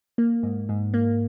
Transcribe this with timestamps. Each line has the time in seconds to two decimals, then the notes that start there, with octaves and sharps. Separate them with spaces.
0.18 A#3
0.43 G#2
0.69 G#2
0.94 A#3